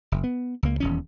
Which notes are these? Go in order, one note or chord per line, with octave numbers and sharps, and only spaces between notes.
F#1
B3
C#2 A#3
D#1 E2 C#4